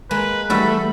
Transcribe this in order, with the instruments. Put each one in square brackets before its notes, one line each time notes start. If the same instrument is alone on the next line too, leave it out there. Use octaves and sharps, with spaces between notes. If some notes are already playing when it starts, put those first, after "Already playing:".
[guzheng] G#3 A#3 [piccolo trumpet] B4
[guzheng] E3 G3 F#4 [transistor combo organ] A3 [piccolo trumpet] B5